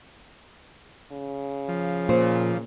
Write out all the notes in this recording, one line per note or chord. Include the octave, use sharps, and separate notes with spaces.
C#3
F3
A#2 C5